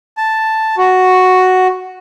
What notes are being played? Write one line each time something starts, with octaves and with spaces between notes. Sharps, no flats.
A5
F#4